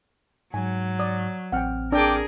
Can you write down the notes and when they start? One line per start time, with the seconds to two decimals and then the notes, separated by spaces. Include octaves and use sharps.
0.54 G#2 F#3 G#5
0.99 D5 D#6
1.52 A1 C4 F#5 G5 F6
1.92 D4 G#4 A#4 D5 G5 D6 E6